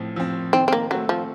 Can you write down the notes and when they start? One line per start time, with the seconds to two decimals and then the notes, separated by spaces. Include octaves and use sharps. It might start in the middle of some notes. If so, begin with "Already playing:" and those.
Already playing: A2 F3 C4
0.16 F3 C4
0.53 D#3 C4
0.68 C4
0.73 A#3
0.91 F#3 A3 C4
1.09 F3